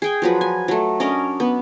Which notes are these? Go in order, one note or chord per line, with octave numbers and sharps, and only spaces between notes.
G#4 G5 G#5
F3 F#3 B4
G#5
F#3 A3
C#4 D4 A#4 D#5
B3